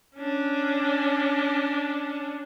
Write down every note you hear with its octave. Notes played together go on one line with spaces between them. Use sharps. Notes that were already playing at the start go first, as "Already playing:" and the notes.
C#4 D4